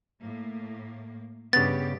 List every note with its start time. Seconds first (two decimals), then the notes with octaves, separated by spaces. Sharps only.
0.21 A2 A#3
1.53 G2 C#3 B3 G4 A6